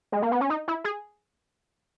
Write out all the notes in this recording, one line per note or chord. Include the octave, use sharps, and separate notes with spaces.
G#3
A#3
B3
C#4
D#4
E4
G#4